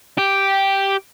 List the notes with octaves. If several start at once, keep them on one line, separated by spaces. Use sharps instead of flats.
G4